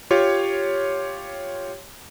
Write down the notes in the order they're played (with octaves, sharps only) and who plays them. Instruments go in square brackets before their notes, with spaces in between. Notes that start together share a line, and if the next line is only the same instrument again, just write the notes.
[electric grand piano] F4 G4 C#5